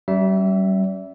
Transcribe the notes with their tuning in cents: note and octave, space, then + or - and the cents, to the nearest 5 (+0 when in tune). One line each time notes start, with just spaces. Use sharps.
G3 -35 C#4 +0 E5 +0